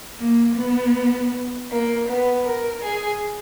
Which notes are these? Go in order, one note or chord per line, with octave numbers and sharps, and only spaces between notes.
A#3
B3
A#3
B3
A#4
G#4